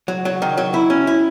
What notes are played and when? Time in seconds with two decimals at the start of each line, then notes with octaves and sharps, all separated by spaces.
0.08 F#3
0.25 F#3
0.42 D#3
0.57 F#3
0.74 E4
0.90 C#4
1.07 E4